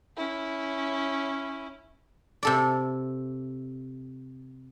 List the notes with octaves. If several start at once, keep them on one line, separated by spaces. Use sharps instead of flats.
C#4 E4
C3 A4 D5